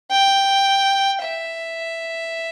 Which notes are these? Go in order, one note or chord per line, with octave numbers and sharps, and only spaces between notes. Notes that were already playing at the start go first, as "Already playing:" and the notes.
G5
E5